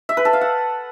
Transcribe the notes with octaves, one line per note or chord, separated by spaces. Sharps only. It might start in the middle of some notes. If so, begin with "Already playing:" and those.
E5
B4
A4
F5
F#5